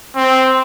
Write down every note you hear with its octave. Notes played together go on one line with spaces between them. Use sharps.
C4